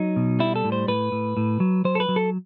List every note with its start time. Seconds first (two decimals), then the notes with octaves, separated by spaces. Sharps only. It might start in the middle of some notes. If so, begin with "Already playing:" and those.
Already playing: F#3 D#4
0.16 B2
0.39 G3 E4
0.56 A4
0.65 A2
0.72 C5
0.88 A2 B4
1.12 A2
1.37 A2
1.60 F#3
1.85 F#3 C5
1.95 A4
2.00 B4
2.09 F#3
2.16 A4